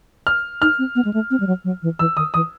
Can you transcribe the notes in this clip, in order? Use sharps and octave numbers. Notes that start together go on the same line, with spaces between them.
F6
D#4 F6
C4
B3
G#3
A3
C4
G3
F#3
F#3
E3
E3 E6
D#3 D#6
E3 D#6